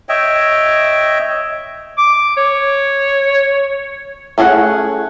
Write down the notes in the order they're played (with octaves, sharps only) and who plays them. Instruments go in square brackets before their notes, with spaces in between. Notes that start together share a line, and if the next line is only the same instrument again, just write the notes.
[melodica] C#5 D#5 E5 G5
[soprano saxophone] D6
C#5
[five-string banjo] A3 C#4 G#4 A4 F#5